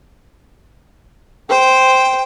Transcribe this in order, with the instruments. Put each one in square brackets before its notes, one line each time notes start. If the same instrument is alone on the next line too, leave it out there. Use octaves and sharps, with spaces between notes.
[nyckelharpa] C5 [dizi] G5